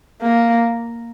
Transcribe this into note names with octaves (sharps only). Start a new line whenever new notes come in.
A#3